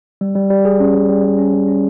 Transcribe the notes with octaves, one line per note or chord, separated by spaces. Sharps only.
G3
G3
G3
G#4
C#4
G3
G3
G3
C#4
G3
C#4